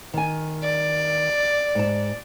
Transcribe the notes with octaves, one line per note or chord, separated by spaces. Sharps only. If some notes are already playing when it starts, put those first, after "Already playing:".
D#3 G#5
D5
G#2 A5